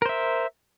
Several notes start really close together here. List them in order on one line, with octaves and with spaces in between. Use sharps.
A#4 C5 E5